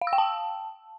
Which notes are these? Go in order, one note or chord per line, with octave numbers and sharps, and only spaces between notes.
F5
E6
G5
A5